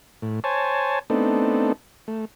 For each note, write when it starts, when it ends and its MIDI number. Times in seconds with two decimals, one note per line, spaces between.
0.22 0.40 45
0.44 0.99 72
0.44 0.99 73
0.44 0.99 80
0.44 0.99 81
1.10 1.72 57
1.10 1.72 59
1.10 1.72 60
1.10 1.72 62
1.10 1.72 63
1.10 1.72 69
2.08 2.25 57